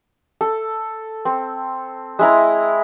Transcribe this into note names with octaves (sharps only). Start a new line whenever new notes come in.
A4
C4
G#3 E4 A#5